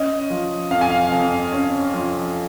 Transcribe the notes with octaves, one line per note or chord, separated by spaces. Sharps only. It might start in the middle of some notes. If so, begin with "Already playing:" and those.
Already playing: C#4 D#5
F3
F2 F5
G#5
F5
F2
C#4
F3